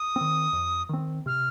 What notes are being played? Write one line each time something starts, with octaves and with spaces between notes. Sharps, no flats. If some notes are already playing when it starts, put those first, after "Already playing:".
Already playing: D#6
D#3 C4
F2
D#3 C4
C3 F6